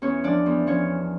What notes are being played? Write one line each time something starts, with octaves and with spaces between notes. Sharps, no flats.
E2 C#4 C#5
F3 D4 D5
E2
F3 C#4 C#5